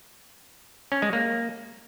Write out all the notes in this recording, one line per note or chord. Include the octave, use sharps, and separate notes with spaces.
C#4
G#3
A#3